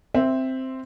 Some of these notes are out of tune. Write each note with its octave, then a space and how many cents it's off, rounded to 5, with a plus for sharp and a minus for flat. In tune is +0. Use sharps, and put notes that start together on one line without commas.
C4 +0 C5 +0 E5 +0